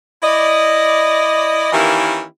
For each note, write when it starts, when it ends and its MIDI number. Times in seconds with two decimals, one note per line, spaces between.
0.23 1.70 64
0.23 1.70 74
0.23 1.70 75
1.73 2.24 51
1.73 2.24 52
1.73 2.24 58
1.73 2.24 61
1.73 2.24 64
1.73 2.24 67